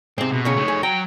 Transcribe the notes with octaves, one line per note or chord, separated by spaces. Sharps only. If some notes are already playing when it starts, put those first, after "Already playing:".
G#2 C3 C4
B2
A#2 C#3 F#3 C#5
A3 D#4
G#4
F#3 G5 A#5